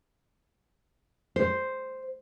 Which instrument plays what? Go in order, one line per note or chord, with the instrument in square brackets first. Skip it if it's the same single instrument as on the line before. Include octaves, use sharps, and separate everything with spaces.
[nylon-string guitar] C5